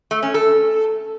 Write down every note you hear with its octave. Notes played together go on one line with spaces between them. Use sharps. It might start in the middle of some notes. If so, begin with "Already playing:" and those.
A3
C#4
A4